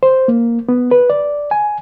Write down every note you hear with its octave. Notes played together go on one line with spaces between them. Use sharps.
C5
A#3
B3
B4
D5
G#5